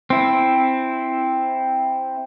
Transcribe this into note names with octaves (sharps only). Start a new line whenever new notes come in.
C4 E4